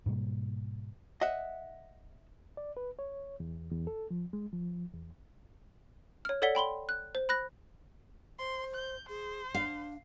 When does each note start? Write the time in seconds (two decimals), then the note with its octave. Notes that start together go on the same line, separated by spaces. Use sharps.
0.06 G#2 B2 G3 A#3
1.21 D#5 E5 F#5
2.57 D5
2.77 B4
2.99 C#5
3.40 E2
3.71 E2
3.87 A4
4.10 F3
4.33 G#3
4.53 F3
4.94 E2
6.25 C#5 F6
6.42 A4 C#5 D5 F#5 B6 G7
6.55 G5 B5 C6 G7
6.89 F#6
7.15 C5
7.29 B5 F#6 A#6
8.39 C5 C6
8.75 G6
9.09 G#4 C5
9.54 D4 F5